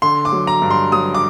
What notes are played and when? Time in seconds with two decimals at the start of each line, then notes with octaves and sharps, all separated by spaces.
0.02 D3 C6
0.25 D6
0.32 F#3
0.47 A#5
0.62 G2
0.71 C6
0.92 F#3 D#6
1.15 D6